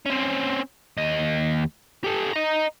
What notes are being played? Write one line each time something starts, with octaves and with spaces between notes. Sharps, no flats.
C4 C#4
D#2 D#5
G4 A4
D#5 A#5